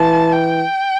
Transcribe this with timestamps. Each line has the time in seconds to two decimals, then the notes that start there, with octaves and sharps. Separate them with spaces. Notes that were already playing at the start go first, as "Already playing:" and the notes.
Already playing: E3 A5
0.32 G5